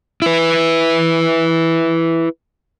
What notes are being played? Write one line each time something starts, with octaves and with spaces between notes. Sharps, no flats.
E4 B4